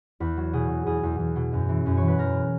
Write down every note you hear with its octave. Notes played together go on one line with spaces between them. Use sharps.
E2 B4
F#3
B2 G#4
B2
E2 G#4
E2
E2
B2
F#2
E3
F#2
E3 C#5
B4
F#2 A#4